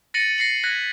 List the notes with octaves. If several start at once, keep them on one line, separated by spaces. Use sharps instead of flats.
A6 A#6 C#7 D#7 F#7
A#6 C7 C#7 F#7
F#6 G#6 A#6 B6